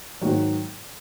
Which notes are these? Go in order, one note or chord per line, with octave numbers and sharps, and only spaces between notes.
G#2 D#3 F#3